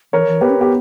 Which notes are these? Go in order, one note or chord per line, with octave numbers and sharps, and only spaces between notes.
E3 A#4 C#5
E3
B3 G4 B4
C#4
B3 G4